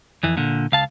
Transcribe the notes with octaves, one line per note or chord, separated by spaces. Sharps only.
F2 E3
A#2 D3
C#2 F5 A5